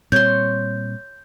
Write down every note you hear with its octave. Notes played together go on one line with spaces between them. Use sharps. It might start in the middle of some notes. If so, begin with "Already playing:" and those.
A#2 G3 C4 C#5 C6 G6